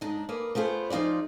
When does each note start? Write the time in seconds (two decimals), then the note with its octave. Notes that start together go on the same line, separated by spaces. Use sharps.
0.01 G#2 D4 D#4
0.29 A#3 G#4 B4 D5
0.55 A3 B3 F4 G#4 C5
0.90 F3 D#4 F4 G#4 D5